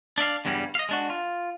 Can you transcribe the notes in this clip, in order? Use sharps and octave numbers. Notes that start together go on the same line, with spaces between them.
D4 D5 E5 F5
E2 G2 C#3 F#3 G3
D#5 F5
G#3 D4 F#4
F4